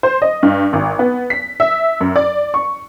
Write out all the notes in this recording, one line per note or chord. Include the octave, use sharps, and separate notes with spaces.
C5
D#5
G2
G#1
B3
B6
E5
F#2
D5
C#6